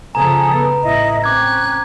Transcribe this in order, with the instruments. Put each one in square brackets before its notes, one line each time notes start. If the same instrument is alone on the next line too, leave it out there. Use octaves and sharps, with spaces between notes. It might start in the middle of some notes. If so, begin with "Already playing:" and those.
[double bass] C#3 F3 [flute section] A4 G#5 D#6 [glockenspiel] A#5
[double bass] B3
[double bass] A1 [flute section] E4 D#5
[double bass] C4 C#4 [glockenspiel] D6 G#6 [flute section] F#6